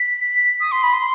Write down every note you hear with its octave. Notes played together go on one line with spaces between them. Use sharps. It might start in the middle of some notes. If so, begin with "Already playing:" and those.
Already playing: B6
D#6
C6
B5
C6